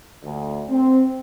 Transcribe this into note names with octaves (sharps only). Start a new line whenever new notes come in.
D2
C4